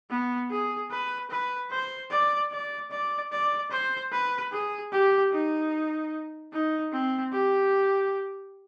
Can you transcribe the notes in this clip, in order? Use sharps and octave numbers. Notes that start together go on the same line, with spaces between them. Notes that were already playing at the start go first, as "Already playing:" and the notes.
B3
G#4
B4
B4
C5
D5
D5
D5
D5
C5
B4
G#4
G4
D#4
D#4
C4
G4